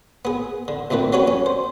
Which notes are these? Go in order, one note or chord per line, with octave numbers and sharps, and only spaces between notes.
B3 G#4
D3
C2 A#2 D#3 A3 B4
F#3 G3 C#4 F#4 B4 C#5
C#4
C5